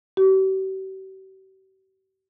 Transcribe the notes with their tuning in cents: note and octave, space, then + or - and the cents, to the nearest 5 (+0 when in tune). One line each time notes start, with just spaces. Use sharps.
G4 -45